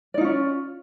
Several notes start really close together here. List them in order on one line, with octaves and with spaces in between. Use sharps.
D5 D#4 F4 C#4